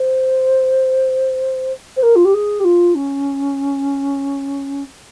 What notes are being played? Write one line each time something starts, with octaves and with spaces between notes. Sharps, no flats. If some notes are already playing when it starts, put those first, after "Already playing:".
Already playing: C5
C5
A#4
F4
G4
G#4
G4
F4
C#4